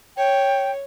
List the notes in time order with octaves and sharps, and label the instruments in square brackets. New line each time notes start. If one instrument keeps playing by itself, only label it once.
[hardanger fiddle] C#5 [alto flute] G5